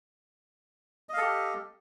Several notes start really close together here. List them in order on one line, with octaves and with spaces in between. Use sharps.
D#5 F5 A4 G4